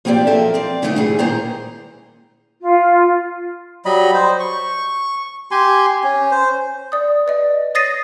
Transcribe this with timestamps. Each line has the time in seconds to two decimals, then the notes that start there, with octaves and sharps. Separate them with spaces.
0.05 F3 A#3 C4 D4 G4 D5
0.27 F3 F#3 A4 A#4 D#5 E5
0.54 C4 D5
0.82 A#2 D3 D#3 F#3 A3 D#4
0.96 G#2 E3 G3 G#4
1.19 A#2 D#3 A#3 G#4 C5 A#5
2.62 F4
3.85 F#3 G3 D#5 B5
4.14 C5
4.40 C#6
5.51 G4 G#5 C6
6.04 C#4
6.31 C5
6.92 D5 D#6
7.26 B4 D5 D#5
7.75 C#5 D#6 A6 A#6 C7 D#7